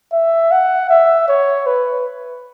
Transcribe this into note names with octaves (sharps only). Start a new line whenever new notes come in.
E5
F#5
E5
C#5
B4